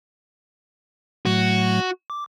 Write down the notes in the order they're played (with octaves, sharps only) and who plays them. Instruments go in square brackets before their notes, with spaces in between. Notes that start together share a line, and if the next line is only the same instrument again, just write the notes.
[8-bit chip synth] A2 F#3 A3 [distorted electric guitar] F#4
[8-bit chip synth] D6